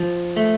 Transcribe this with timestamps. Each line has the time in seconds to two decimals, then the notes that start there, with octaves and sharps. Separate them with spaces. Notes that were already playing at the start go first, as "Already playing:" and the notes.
Already playing: F3
0.37 A3